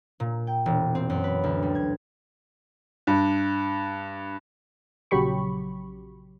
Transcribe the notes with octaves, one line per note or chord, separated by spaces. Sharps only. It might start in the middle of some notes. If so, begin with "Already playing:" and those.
A#2
G5
E1
C4
F#2
B4
D2
G3
G#6
G2
A#1 C#3 F#3 G4 B5 C#6